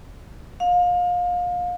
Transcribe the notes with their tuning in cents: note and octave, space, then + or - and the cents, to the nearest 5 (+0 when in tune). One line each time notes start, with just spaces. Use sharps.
F5 +30